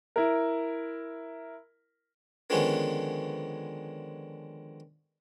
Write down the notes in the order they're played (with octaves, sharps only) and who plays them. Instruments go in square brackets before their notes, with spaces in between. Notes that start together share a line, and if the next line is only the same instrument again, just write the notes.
[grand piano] E4 A#4
[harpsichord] D3 D#3 F3 G#3 B3 C#4